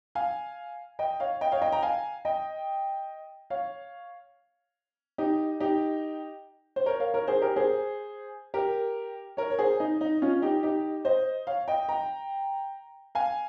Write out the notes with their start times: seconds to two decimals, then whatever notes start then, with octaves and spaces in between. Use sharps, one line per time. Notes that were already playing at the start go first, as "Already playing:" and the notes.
0.15 F5 G#5
0.99 D#5 G5
1.20 C#5 F5
1.41 D#5 G5
1.52 C#5 F5
1.62 D#5 G5
1.72 G5 A#5
1.83 F5 G#5
2.25 D#5 G5
3.50 C#5 F5
5.18 D#4 G4
5.60 D#4 G4
6.76 C5
6.86 A#4 C#5
7.00 C#5 F5
7.14 A#4 C#5
7.27 G#4 C5
7.42 G4 A#4
7.56 G#4 C5
8.54 G4 A#4
9.37 A#4 C#5
9.50 C#5
9.59 G#4 C5
9.80 D#4
10.01 D#4
10.22 C#4 F4
10.42 D#4 G4
10.63 D#4 G4
11.05 C5 D#5
11.47 C#5 F5
11.68 D#5 G5
11.89 G5 A#5
13.15 F5 G#5